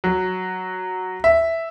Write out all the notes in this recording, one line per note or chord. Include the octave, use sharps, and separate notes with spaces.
F#3
E5